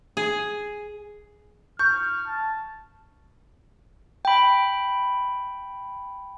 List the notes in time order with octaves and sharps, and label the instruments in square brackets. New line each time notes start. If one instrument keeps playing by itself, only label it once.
[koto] G#4
[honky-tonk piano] C#6 [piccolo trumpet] F6 [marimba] G6
[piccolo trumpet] A5
[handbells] G5 B5